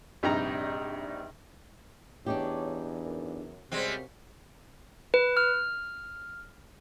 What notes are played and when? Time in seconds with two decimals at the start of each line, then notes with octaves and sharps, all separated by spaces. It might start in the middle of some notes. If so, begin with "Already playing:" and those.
0.23 A#1 G2 C3 D#4 G5 A#5
2.26 E2 D4 D#4 G4 C#5
3.05 F#2
3.72 C3 G3 G#3 A#3 C4 C#4 F#4
5.14 B4
5.37 F6